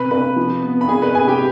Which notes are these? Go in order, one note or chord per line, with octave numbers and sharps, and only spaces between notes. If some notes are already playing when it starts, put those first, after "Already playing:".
Already playing: C3 B4 B5
C3 B4 B5
F3
B3
B5
C3 G#4 G#5
B4 B5
C3 G#4 G#5
G4 G5